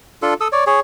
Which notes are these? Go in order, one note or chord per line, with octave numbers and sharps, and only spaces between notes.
D4 F4 A4
A4 D#6 E6
C#5 D5
G#4 C#5